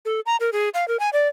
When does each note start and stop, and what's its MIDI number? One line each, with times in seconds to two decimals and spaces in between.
0.05 0.20 69
0.26 0.36 82
0.40 0.50 70
0.52 0.69 68
0.74 0.87 77
0.88 0.97 70
1.00 1.10 80
1.13 1.28 74